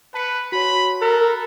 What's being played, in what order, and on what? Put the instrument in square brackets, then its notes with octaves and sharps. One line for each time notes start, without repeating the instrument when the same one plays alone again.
[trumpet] B4 [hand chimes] A5 C#7
[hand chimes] F#4 C#5 [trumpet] B5
[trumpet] A4 [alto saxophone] A#4 [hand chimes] F#6